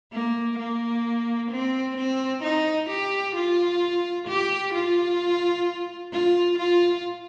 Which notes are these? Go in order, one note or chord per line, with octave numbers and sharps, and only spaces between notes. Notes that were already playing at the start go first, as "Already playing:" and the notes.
A#3
A#3
C4
C4
D#4
G4
F4
G4
F4
F4
F4